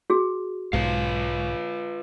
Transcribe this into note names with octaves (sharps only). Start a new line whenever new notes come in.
F#4 G#4
B1 G#2 F4 B4 F5